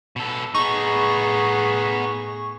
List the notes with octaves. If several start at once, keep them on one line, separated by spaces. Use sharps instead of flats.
B2 A4
A2 B3 D#4 G#4 C#6